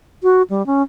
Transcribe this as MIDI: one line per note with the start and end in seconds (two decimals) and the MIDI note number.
0.23 0.43 66
0.50 0.65 55
0.66 0.82 61